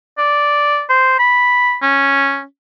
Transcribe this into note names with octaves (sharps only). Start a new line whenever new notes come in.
D5
C5
B5
C#4